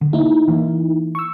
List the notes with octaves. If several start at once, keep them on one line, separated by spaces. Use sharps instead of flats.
D3
A#3 D#4 E4
E3 A#3
C#6 E6